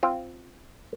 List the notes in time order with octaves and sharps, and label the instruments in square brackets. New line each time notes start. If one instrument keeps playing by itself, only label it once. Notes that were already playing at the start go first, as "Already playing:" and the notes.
[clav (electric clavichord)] C4 F4